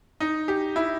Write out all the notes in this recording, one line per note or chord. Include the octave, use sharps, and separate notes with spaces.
D#4
G4
E4